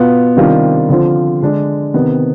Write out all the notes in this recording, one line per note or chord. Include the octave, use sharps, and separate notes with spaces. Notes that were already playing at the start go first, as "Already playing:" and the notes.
Already playing: B2 B3 F4
C3 D#3 G3 D4 F4
D3 F3 C4 F4
D3 G#3 D4
C3 D#3 B3